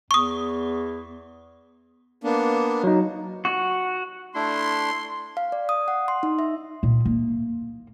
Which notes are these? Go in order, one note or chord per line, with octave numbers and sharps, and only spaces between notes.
E2 C#6 D#6
A#3 B3 D4
F#3 D#4
F#4
A3 D4 E4 C6
F5
D5
D#6
F#5
C6
D#4
E5
A#2
A#3